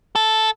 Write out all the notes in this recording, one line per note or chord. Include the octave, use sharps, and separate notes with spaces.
A4